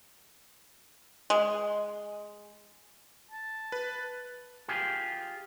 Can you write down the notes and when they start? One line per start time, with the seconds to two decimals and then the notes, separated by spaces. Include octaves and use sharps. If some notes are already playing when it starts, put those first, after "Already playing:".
1.30 G#3
3.31 A5
3.72 B4
4.68 F4 G4 G#4